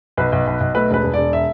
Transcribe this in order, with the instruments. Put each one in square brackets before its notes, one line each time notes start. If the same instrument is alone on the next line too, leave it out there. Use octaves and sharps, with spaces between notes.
[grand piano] B1 B4
B1
B1
B1
A3 B4
E1 B4
E1
E1 D5
E5